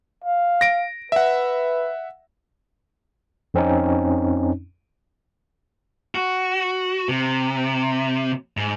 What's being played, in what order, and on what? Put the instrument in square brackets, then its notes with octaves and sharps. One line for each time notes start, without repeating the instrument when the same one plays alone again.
[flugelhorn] F5
[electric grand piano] A#6 D7
[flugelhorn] B4 [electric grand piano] E5 F#5
[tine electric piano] F2 C4 C#4 D#4
[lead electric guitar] F#4
C3
G#2